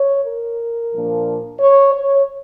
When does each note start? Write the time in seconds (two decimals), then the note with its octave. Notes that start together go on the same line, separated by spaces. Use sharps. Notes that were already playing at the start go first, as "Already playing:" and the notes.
Already playing: C#5
0.24 A#4
0.92 A#2 F3 A#3 D4
1.59 C#5
1.93 C#5